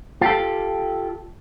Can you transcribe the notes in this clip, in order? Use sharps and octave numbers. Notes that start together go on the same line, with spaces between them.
F4 G4 A4